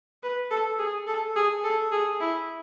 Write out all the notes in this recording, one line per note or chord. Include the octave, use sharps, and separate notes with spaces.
B4
A4
G#4
A4
G#4
A4
G#4
E4